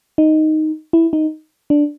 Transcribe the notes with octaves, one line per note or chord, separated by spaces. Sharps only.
D#4
E4
D#4
D4